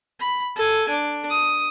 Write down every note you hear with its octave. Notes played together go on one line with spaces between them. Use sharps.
B5
A4 G#5
D4
D#6